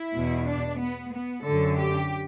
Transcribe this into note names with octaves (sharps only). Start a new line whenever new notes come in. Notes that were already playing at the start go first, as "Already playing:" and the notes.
Already playing: E4
E2 B2
D4
B3
B3
F#2 D3 A4
G4